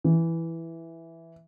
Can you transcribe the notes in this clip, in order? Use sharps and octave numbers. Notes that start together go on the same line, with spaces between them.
E3